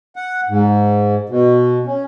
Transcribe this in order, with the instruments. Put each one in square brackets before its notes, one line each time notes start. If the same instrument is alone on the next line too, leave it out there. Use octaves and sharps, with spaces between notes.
[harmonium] F#5
G#2
B2
C#4